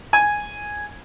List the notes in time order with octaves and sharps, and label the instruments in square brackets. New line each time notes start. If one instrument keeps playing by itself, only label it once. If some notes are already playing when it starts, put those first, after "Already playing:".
[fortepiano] G#5